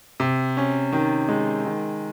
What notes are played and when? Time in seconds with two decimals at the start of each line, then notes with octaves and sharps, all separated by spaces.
0.20 C3
0.57 C#4
0.93 D#3
1.28 G#3
1.65 D#3